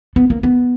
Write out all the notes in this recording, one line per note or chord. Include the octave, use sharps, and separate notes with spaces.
B3
A#3
B3